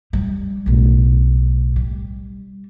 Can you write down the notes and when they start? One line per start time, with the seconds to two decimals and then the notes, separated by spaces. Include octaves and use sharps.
0.13 G3
0.66 B1 A2
1.76 G3